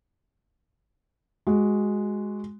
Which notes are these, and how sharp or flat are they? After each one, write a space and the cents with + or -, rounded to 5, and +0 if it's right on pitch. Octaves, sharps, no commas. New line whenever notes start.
G#3 +0 F#4 +0